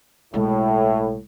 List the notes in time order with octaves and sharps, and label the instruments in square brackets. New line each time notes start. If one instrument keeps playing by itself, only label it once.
[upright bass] B1 G#3 [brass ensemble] A2